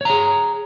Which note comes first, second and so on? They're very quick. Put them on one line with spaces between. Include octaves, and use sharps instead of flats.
C#5 A#5 G#4